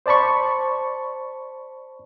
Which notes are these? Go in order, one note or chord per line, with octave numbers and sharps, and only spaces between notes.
C5 D5 A5 B5 C#6